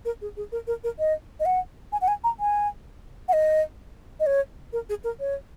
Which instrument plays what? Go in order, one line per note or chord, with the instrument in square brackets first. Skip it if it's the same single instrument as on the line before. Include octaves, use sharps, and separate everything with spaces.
[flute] A#4
G#4
G#4
A#4
A#4
A#4
D#5
D#5
F#5
G#5
F#5
G#5
A#5
G#5
F#5
D#5
D#5
C#5
A#4
G#4
A#4
C#5